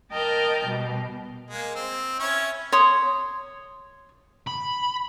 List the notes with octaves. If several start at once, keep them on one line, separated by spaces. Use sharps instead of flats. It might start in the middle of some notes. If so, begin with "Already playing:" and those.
A#4 D#5 G5 A5 F6 G6
B2 G3
G#3 A#3
C4
C#4 E4 C#5
C#5 C6 D#6
B5